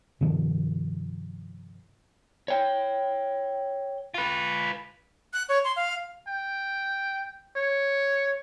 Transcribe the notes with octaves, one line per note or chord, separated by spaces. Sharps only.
G2 C3 D#3 F3
C#5 G5
F4 B4
F#6
C#5
C6
F5
G5
C#5